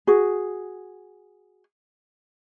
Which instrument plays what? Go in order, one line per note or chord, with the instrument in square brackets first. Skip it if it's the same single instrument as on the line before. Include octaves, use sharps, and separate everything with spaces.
[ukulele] F#4 G#4